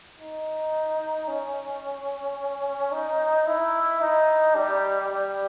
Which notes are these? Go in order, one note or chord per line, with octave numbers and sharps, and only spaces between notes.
D#4
C#4
D#4
E4
D#4
G3
G3